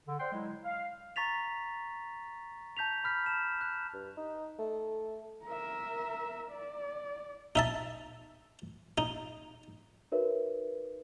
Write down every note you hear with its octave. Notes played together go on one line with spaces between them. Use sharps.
D3
C5 D5 F#5 G5 C6
F#3 G#3 E4
F5
A#5 C#6 A6 B6 F7
A5 G6 B6 F7
B5 F6 B6
A5 E7
F#6
G2
D#4
A3
A#4 E5
D5
D#4 E5 A5
D#4
D#4 F#4 A#4 B4 C#5 E5